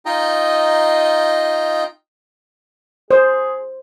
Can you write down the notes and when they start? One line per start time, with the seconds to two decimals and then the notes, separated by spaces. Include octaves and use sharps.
0.06 D#4 F4 D#5 G5 A#5
3.11 G#4 C5